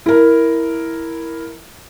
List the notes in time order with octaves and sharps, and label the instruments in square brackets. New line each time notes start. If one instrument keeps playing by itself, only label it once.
[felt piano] E4 A#4